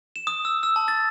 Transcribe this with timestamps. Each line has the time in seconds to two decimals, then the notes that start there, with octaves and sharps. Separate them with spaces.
0.16 E7
0.27 D#6
0.45 E6
0.63 E6
0.76 A5
0.88 A6